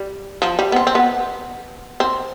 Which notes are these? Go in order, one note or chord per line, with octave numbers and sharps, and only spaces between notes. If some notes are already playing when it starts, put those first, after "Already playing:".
Already playing: G3
F3
G3
B3
C4
C4
B3
C4